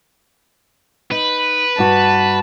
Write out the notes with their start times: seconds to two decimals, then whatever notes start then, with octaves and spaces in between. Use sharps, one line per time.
1.11 D#4 B4
1.78 G2 F#4 A5